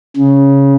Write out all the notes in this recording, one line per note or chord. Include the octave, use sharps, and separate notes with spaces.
C#3